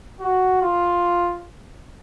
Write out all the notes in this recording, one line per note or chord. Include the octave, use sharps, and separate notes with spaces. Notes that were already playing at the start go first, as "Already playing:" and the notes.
F#4
F4